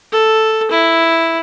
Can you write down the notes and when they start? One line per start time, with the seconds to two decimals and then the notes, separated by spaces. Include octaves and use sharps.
0.12 A4
0.71 E4